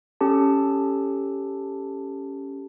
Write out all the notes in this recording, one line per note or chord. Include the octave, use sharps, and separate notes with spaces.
C#4 G4 A4 A5